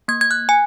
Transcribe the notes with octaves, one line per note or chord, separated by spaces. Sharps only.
A#3 G#6
G#6
F#6
G#5